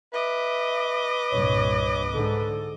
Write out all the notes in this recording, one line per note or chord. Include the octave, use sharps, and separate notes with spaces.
B4 D#5 E5 D6
C2 G2 A#2 C#5
G#2 D3 A4